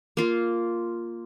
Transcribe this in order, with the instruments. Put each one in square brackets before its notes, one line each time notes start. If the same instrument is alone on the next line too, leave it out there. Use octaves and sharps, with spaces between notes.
[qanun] A#3 F4